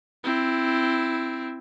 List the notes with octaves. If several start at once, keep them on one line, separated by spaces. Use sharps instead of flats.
C4 E4